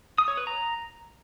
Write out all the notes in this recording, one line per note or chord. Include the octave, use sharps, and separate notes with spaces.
D#6
C#5
B4
A#5